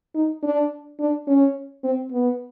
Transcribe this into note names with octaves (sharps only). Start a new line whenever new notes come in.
D#4
D4
D4
C#4
C4
B3